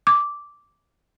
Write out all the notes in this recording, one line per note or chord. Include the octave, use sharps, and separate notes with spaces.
D6